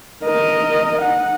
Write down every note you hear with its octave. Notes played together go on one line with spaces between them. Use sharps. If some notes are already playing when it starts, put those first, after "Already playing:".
A#4 D#5
F#5